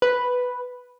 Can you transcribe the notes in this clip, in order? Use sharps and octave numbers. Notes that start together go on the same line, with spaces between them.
B4